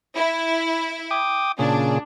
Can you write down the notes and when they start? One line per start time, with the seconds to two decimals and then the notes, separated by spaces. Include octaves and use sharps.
0.16 E4
1.11 G5 D6 D#6
1.59 A#2 C#3 D4 G#4